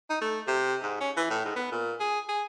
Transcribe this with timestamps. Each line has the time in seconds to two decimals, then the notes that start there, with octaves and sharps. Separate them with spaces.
0.10 D#4
0.21 A3
0.47 C3
0.82 G#2
1.00 C#4
1.17 E3
1.30 A2
1.45 G#2
1.56 B3
1.72 A#2
2.00 G#4
2.29 G#4